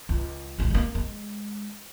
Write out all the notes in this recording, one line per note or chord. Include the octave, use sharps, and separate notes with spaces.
C#2
A#1 G#3
G3 A#3
G#3